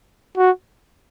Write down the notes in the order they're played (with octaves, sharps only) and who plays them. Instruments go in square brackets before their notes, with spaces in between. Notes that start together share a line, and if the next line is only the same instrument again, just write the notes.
[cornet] F#4